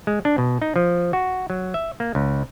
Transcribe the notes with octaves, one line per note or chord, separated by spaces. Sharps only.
G#3
D4
B2
D#4
F3
F#4
F#3
E5
A#3
C#2